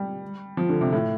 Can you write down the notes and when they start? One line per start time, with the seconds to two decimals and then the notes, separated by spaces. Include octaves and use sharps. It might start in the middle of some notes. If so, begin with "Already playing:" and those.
Already playing: G3
0.57 F3
0.69 D3
0.81 C3
0.92 A2